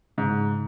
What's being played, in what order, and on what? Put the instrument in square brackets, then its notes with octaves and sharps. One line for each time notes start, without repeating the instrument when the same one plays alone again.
[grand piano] G#2 [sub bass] C#3